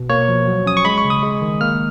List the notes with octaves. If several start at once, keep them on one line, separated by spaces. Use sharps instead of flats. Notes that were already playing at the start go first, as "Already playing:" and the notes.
Already playing: B2
A#3 C#5
F3
F#3
C#4 D#6
C#6
G#3 B5
C#6
C#3
D#6
G#3
D#3
A#3 F6